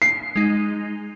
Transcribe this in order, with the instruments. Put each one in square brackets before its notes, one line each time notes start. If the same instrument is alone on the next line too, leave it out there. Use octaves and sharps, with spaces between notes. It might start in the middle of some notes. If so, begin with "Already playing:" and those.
[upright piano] C7
[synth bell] G#3 D#4